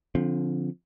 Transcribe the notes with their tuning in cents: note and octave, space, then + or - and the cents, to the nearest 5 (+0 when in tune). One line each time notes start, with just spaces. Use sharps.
D3 -20 F3 +0 C4 +5